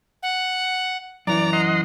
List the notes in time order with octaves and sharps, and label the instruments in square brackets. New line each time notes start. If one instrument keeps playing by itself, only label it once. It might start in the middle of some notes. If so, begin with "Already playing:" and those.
[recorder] F#5
[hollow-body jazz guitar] F#2 E3 [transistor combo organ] D5 [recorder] A#5
[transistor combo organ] D#5 F#5 C6